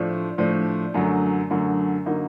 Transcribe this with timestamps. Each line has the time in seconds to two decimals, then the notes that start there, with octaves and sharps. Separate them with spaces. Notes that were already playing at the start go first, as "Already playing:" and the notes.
Already playing: A2 F3 A3 D4
0.38 A2 F3 A3 D4
0.94 F#2 D3 F#3 A3
1.50 F#2 D3 F#3 A3
2.06 D3 F#3 A#3 D#4